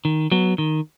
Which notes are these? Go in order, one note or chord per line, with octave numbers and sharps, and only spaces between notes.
D#3
F#3 B3
D#3